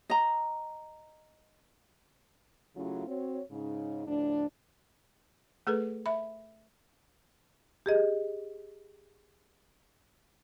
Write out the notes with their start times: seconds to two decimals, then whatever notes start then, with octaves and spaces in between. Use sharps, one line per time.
0.10 D#5 A#5
2.76 C#3 F#3 A3 C#4 E4 F4
3.08 C4 F#4 C#5
3.51 G#2 C#3 D#4
4.07 D2 A2 F3 D4
5.67 A3 G#4 A4 B4
6.06 E5 B5
7.86 G4 G#4 D#5